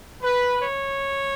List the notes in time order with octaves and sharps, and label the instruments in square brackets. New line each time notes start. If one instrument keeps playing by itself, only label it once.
[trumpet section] B4
C#5